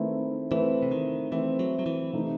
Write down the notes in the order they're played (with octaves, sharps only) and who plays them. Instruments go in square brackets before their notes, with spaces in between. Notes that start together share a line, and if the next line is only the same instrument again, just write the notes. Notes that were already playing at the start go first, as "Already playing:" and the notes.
Already playing: [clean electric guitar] D#3 [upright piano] A3 C4 E4 B4
[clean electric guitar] E3 [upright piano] A3 C4 E4 B4
[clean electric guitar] C3
D#3
[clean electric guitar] E3 [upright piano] A3 C4 E4 B4
[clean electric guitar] F#3
F#3
E3
[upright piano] C3 E3 A3 D#4